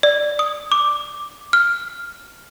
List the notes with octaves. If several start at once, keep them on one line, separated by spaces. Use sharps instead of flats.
D5
D#6
D6
F6